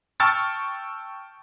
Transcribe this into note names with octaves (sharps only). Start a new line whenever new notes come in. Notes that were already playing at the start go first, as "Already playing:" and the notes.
G5 A5 C#6 E6 F6 A6